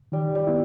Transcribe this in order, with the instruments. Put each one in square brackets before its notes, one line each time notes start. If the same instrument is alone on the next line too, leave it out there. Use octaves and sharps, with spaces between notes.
[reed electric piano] D#3 [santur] G3
[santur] G3
[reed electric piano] B3 E4